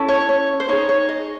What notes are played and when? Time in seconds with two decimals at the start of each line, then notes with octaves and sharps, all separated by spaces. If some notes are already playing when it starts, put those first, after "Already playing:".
Already playing: C#4 E4 A4
0.08 C#5
0.29 C#5
0.60 C5
0.69 D#4 G#4 C#5
0.89 C#5
1.09 D#5